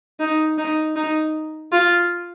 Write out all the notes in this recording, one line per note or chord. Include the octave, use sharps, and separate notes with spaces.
D#4
D#4
D#4
F4